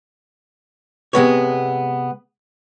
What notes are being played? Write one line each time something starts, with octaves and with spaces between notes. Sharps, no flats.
C3 G#3 B3 C#5